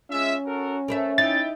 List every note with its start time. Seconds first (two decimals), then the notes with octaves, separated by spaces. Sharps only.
0.11 G#3 C#4 F4 E5
0.45 F#4 A4 A#4
0.88 A3 A#4 B4 E5
1.18 D#4 E4 G5 A6